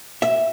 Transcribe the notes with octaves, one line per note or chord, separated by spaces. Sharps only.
E5